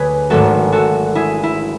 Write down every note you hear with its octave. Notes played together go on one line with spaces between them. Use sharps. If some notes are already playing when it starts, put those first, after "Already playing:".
Already playing: D2 D3 F#3 G#4 B4 C#5
G#1 G#2 F#3 A3 F#4 A4
F#4 A4
E4 G#4
E4